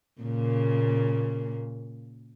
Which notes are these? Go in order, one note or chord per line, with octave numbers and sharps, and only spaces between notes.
A#2 C#3 A#3